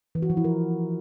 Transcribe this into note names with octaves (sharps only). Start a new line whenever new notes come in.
E3
F#4
F3
E4
A#4